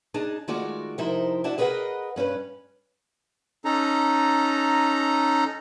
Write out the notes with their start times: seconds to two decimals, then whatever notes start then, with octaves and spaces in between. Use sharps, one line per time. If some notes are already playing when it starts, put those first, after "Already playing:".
0.14 D4 D#4 G#4 A5
0.48 D#3 G#3 A3 F4 F#4 D5
0.98 C3 F3 D#4 E4 A#4 C5
1.44 D4 E4 F#4 A5
1.58 G#4 A#4 B4 C#5 D#5 F#5
2.16 G2 C#4 A4 B4
3.65 C#4 D#4 A4 A#5